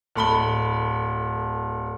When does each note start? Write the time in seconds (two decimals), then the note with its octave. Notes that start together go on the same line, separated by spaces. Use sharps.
0.15 D1 A4 B5 G7